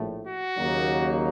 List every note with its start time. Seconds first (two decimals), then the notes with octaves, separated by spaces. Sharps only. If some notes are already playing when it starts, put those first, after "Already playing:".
Already playing: A#1 A2 A3
0.25 F#4
0.57 D#2 C#3 F#3 A#3 D#4